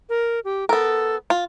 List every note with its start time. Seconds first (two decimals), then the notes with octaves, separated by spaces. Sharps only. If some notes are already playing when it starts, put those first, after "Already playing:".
0.09 A#4
0.45 G4
0.69 B3 A4 A#4
1.30 F4